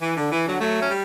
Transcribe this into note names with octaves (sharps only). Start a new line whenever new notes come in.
E3
D3
E3
D3 F#3
F#3 A3
C#4
G3